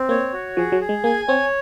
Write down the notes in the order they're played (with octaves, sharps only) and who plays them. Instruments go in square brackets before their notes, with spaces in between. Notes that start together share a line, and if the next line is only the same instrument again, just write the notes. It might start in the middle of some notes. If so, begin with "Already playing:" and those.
Already playing: [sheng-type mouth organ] C4
[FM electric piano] A#3 [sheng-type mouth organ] C#5
[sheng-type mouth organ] F#4
[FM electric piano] F3 [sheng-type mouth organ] G#4
[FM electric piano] F#3
[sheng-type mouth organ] G#4
[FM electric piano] G#3
[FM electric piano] A#3 [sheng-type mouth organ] G#5
[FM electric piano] C4 [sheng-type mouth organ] C#5